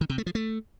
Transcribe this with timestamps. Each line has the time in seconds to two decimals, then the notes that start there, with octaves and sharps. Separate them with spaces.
0.01 D#3
0.10 C3
0.18 A3
0.26 F3
0.35 A3